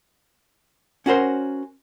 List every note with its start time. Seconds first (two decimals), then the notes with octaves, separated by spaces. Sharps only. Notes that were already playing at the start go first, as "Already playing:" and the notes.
1.06 C#4 F#4 A#4 C5